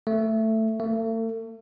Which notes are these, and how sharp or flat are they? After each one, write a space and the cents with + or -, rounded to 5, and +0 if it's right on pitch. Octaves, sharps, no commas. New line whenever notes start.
A3 +10
A3 +40